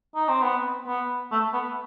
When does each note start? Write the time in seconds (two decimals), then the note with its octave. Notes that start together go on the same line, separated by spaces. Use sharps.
0.15 D#4
0.29 C4
0.42 B3
0.87 B3
1.32 A3
1.53 B3